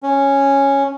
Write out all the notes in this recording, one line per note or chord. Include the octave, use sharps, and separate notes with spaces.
C#4